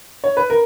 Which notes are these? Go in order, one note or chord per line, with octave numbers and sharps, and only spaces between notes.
C#5
B4
A#4